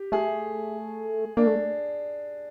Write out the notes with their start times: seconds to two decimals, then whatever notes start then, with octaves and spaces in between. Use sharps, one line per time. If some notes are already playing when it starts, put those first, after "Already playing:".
Already playing: G4
0.12 A3 G#4
1.37 A#3 D4
1.46 A3